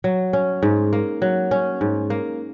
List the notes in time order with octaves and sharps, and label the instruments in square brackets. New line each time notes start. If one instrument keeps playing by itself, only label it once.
[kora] F#3
C#4
G#2
A#3
F#3
C#4
G#2
A#3